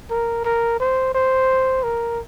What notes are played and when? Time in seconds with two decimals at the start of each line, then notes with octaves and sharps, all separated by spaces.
0.11 A#4
0.45 A#4
0.80 C5
1.15 C5
1.83 A#4